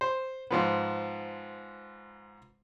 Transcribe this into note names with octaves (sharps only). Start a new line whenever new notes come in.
C5
G#2 F3 B3